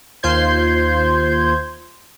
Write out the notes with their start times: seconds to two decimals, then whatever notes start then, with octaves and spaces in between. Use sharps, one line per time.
0.23 D#2 F4 C5 C6 G6 G#6